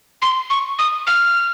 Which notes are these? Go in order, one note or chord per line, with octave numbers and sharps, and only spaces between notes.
C6
C#6
D#6
F6